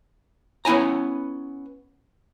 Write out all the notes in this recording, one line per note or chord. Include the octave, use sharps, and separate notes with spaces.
B3 C#4 E4 G#5 A#5